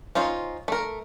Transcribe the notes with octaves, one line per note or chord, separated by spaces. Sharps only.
C#4 D#4 F4 C5
A3 A#4